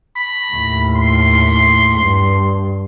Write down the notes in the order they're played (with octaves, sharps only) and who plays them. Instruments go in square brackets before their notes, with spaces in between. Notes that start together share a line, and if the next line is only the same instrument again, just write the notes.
[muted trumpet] B5
[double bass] D#2 A2
[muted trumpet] C6
[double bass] G2